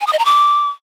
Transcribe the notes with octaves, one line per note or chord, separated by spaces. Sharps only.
G#5
D#6
D#5
A#5
D6